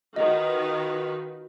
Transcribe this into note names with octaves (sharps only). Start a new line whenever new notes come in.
D#3 F4 F#4 B4 D#5